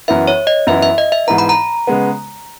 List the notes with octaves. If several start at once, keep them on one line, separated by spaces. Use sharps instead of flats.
F#2 E3 B3 E5
C#5
D#5
F#2 E3 B3 E4 E5
E5
D#5
E5
G#2 E3 B3 A#5
B5
A#5
C#3 G#3 B3